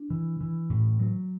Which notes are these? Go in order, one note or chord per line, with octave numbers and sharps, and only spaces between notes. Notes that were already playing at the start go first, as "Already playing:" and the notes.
Already playing: D4
E3
E3
A2
F#3